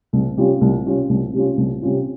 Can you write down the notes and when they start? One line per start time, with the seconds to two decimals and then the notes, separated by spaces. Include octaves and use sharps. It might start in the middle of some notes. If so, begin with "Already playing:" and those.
0.13 C2
0.37 C3 G3 C#4 F4
0.61 C2
0.85 C3 G3 C#4 F4
1.09 C2
1.34 C3 G3 C#4 F4
1.57 C2
1.82 C3 G3 C#4 F4